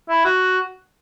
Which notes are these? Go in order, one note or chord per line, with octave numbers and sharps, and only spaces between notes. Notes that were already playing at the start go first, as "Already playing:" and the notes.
E4
F#4